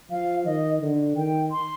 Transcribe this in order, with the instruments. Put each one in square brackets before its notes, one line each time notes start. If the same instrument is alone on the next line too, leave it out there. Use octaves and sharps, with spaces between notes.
[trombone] F3 [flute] F5
[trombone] D#3 [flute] D#5
[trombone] D3
[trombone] D#3 [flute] G5
[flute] C6